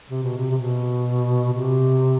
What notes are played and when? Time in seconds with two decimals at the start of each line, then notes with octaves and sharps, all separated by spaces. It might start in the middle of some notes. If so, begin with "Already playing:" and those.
0.10 C3
0.23 B2
0.37 C3
0.50 C3
0.58 B2
1.53 C3